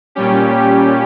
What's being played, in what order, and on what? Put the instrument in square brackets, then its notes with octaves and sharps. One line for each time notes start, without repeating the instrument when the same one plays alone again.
[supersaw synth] A#2 G3 C#4 G4